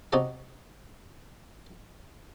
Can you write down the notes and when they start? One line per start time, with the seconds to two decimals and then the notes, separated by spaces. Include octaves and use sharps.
0.12 C3 D#4 F#4 D#5 A5 D6